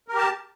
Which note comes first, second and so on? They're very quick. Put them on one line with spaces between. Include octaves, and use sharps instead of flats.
A#4 G4 A5